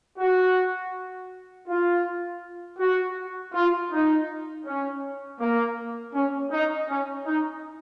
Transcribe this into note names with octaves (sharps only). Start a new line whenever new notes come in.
F#4
F4
F#4
F4
D#4
C#4
A#3
C#4
D#4
C#4
D#4